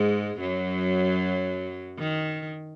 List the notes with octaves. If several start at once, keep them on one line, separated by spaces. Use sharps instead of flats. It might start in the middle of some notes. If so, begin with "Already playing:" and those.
Already playing: G#2 G#3
F#2 F#3
D#3